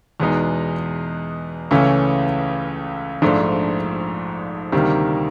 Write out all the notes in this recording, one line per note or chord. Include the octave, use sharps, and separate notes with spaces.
E2 B2 G#3 B3 D#4
C#2 C#3 E3 A3 C#4
A#1 G#2 F3 A3 D4
D2 C3 D#3 G3 A#3